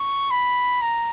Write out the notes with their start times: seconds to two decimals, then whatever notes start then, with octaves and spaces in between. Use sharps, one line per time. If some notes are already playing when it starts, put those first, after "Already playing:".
Already playing: C#6
0.31 B5
0.82 A#5